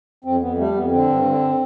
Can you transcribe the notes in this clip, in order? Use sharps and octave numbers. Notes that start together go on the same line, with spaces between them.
F2 C4
F2 B3
G3 A3
F2 B3
D3 C4
G2
D3